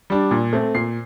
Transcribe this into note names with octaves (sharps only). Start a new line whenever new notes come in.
G3 D4
A#2
A3 C4
A#2 C7